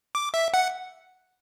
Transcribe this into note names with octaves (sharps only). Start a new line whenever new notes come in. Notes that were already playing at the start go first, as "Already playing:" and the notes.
D6
E5
F#5